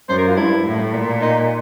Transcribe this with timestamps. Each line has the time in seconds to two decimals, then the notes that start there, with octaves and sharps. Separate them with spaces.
0.09 F#2 C5
0.18 A#4
0.28 F4
0.36 G2 E4
0.66 A2
0.94 A#2
1.22 D#4